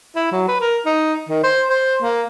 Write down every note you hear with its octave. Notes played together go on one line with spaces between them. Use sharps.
E4
F#3
B4
A#4
D#4
D#3
C5
C5
A#3